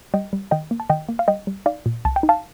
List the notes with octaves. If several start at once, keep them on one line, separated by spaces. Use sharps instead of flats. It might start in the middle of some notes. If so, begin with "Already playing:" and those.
G3 D#5 G5
G3
D#3 D#5 G5
A#3
A5
D#3 D#5 G5
A#3
F5
G3 D#5 G5
G3
D#4 D5 F5
A#2
C2 A5
G5
D#4
F5 A5